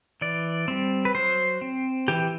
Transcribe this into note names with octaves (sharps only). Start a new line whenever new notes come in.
E3 D5
G3 C4
B4
F#3 C5
C4
E3 G4